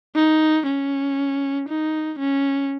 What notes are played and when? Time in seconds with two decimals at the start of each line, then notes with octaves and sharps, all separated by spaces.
0.15 D#4
0.66 C#4
1.68 D#4
2.19 C#4